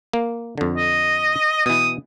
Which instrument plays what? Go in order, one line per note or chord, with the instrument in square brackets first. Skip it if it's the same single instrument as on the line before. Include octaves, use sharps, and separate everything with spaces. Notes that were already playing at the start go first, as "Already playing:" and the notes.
[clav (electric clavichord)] A#3
F2 D3
[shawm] D#5
[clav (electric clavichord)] B2 E3 [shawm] D#6